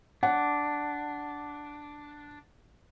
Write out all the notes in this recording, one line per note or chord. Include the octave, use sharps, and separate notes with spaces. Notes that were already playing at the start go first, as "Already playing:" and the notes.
D4 F#5